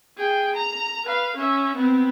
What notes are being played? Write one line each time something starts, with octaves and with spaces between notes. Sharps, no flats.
G#4 G5
A#5
B4 F5
C#4 E5
B3 C4